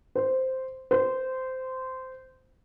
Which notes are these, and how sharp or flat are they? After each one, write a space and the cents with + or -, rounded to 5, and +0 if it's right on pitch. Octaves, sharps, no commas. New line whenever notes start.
C5 -5
C5 -15